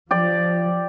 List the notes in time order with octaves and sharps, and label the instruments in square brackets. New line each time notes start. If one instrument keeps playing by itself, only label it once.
[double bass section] F3 [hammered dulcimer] G4 D5